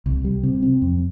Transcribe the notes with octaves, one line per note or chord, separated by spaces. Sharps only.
C2
G3
C3
C4
F2